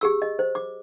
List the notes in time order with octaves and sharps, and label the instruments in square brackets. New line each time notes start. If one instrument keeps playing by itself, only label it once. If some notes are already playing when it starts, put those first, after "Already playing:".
[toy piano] G4 G#4 E6
D#5
C5
D6